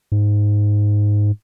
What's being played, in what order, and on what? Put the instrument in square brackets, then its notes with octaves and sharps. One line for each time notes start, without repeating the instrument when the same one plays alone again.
[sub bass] G#2